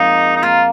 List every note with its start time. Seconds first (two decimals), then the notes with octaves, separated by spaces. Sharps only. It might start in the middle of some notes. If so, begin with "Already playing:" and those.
Already playing: F2 G#3 A#3 D#4
0.36 D#4
0.43 A#3 F4